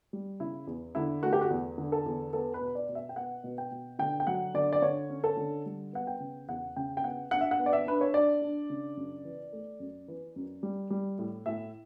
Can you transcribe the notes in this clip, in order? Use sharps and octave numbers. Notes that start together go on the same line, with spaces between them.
G3
C#3 E4
E2
D3 E4
A3 F#4
G4
F#4
E2
D3
A4
E2
B3 A4
B4
B2
D5
B2
E5
G5
B3 F#5
B2
G5
B2
D3 G5
G5
F#3 F#5
D3 D5
D5
D3 C#5
C#4
A4
D3
G3
B3 F#5
G5
C#3
E2 F#5
C#3 G5
G5
B3 F#5
D4 F#5
E5
F#5
B3
D5
E5
D4 B4
C#5
D4 D5
D4
C#3
F#2
E3
A3
F#2
E3
F#2
G3
G3
A2
A2 E5